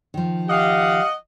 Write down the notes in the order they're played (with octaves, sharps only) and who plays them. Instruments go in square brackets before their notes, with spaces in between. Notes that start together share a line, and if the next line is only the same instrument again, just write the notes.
[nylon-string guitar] D#3 F3
[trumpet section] G4 F5 [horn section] D#5 F#5